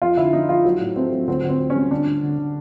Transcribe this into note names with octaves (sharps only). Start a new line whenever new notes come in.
F2 F4
D3 E4
F2 D#4
F2 F4
F#3
A2
A3 C4
F#3
D2 C4
D2
C4
D2
C#4
G3
D3 D4
D2
D3
D3